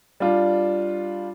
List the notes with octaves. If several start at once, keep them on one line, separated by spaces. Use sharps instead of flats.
G3 D4 F4